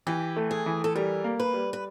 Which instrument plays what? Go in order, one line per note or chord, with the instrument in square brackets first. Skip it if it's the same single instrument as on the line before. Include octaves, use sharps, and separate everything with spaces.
[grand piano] E3 [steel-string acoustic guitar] G4
[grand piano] A3
[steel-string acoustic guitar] G#4
[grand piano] E3
[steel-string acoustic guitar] A4
[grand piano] G3 [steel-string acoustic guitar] A#4
[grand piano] A#3
[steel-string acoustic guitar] B4
[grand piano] G3
[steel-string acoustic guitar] B4